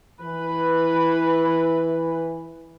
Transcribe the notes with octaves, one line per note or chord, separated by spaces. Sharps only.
E3 B4